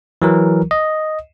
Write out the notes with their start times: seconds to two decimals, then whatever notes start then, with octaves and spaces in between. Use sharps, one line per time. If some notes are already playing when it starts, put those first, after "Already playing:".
0.22 E3 F#3 A#4
0.71 D#5